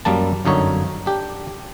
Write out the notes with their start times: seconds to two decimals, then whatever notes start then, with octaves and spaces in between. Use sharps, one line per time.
0.05 F#2 G3 A#3 A5
0.45 G1 F#2 D3 D#4 C#5
1.06 D4 G4